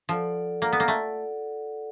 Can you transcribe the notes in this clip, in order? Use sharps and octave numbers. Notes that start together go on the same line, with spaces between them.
F3 F4 A4 D5 F#5
A#3 F4 A4 D5 F#5
B3
A#3
A3